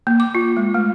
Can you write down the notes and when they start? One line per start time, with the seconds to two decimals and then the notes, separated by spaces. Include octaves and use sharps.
0.07 A#3
0.20 D6
0.35 F4
0.57 G#3
0.74 A3